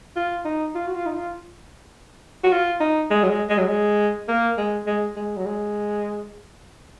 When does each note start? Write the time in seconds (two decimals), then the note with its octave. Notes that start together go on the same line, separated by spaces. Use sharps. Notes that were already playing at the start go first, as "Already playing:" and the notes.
0.16 F4
0.45 D#4
0.75 F4
0.87 F#4
0.95 F4
1.06 D#4
1.14 F4
2.44 F#4
2.52 F4
2.81 D#4
3.11 G#3
3.23 F#3
3.30 G#3
3.49 G#3
3.58 F#3
3.67 G#3
4.28 A#3
4.58 G#3
4.87 G#3
5.16 G#3
5.37 F#3
5.46 G#3